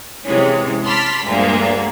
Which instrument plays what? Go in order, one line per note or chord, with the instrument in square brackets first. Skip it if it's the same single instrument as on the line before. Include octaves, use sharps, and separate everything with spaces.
[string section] C3 E3 G#3 C#4
A5 B5 C6 D6 F6 B6
D2 G2 A#2 G#3 A#3